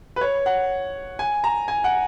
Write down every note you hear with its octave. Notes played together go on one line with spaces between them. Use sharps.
B4
C#5
F#5
G#5
A#5
G#5
F#5